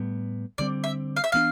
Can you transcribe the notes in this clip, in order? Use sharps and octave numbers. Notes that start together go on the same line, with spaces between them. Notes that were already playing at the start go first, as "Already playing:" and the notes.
Already playing: A2 G3 B3
D3 G3 C4 D5
E5
F5
E5
E3 B3 D4 F5